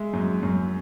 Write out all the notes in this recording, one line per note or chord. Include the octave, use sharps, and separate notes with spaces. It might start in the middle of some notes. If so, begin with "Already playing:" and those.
Already playing: G#3 E5
F#2
F#2